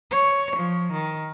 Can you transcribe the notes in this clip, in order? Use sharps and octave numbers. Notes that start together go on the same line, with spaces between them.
C#5
F3
D#3